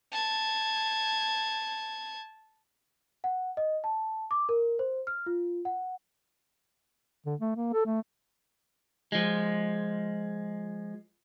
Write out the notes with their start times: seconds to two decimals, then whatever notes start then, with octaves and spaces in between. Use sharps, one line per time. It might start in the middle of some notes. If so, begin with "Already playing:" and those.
0.12 A5 G#6
3.24 F#5
3.57 D#5
3.84 A5
4.31 D6
4.49 A#4
4.79 C5
5.07 F6
5.26 F4
5.65 F#5
7.26 D3
7.40 A3
7.56 A#3
7.73 A4
7.86 A3
9.12 F3 G#3